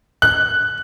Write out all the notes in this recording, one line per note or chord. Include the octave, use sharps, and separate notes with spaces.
F#6